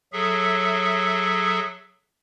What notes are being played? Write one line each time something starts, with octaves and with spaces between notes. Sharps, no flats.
F#3 G#4 A4 E5